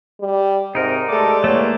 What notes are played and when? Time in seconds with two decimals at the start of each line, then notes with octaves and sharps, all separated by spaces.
0.21 G3
0.75 G#2 C3 D#4 A#4
1.09 G#3 A3 G4 A4 D5
1.44 E2 A3 A#3 C#5